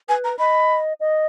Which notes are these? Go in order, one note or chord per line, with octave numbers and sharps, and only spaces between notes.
B4 G#5
A#5
D#5 B5
D#5